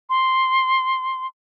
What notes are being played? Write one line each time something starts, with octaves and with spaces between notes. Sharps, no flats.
C6